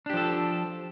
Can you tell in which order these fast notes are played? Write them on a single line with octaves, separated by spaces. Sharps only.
D4 G4 F3 A4